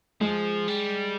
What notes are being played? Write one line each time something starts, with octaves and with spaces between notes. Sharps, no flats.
F3 G#3 G#4
G3